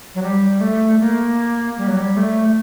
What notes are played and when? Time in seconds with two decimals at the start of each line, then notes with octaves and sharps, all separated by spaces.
0.15 F#3
0.23 G3
0.61 A3
1.00 A#3
1.78 G3
1.87 F#3
1.98 G3
2.17 A3